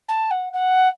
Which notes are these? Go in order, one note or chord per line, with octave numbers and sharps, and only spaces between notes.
A5
F#5
F#5